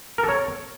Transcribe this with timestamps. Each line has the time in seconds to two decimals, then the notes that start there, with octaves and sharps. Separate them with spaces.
0.18 A#4
0.23 A4
0.29 C#5